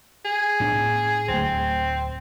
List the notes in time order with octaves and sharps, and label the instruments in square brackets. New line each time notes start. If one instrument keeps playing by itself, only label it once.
[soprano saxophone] G#4
[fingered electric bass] A2 B3 D4
[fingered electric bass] D1 A3 [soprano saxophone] C4